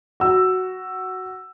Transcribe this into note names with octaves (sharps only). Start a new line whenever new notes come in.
F#4 E6